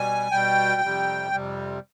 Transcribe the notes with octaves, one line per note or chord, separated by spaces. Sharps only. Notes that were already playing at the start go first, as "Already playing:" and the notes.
Already playing: B2 G3 G#5
B2 G3 G5
F2 C3 G3
F2 C3 G3